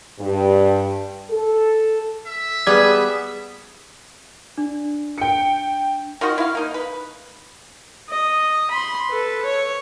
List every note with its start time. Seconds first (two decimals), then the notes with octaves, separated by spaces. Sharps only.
0.20 G2
1.30 A4
2.26 E5
2.67 G3 B3 G#4 D5 G#6
4.58 D4
5.18 G5 C#7
6.21 D#3 F4 F#4 D#5
6.38 E4 F5
6.55 A#3 D#4
6.74 B4
8.10 D#5
8.71 B5 C6
9.10 A4 B4
9.45 C#5